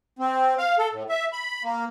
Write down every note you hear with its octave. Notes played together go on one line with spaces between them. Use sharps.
C4
F5
A4
A2
E5
B5
A#3